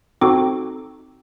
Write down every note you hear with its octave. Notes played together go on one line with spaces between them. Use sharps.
C4 D#4 F#4 A4 D6